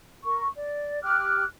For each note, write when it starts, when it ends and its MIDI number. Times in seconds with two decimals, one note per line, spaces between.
0.24 0.47 70
0.24 0.47 85
0.55 0.99 74
1.03 1.44 67
1.03 1.44 86
1.03 1.44 89
1.03 1.44 90